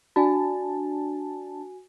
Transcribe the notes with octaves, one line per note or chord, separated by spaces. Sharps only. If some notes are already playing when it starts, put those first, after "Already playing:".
D4 F#4 G#5 A5